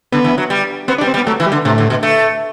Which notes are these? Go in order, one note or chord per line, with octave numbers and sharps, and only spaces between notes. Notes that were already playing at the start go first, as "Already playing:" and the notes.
D3 B3
E3
F#3
G3
B3 C4
D4
G3
C4
G3
B3
F#3 A3
E3
G3
D3
A2 C3
D3
B2
A3